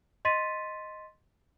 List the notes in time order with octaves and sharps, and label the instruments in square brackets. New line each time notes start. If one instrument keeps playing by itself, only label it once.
[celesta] D#5 C6 A6 B6 D#7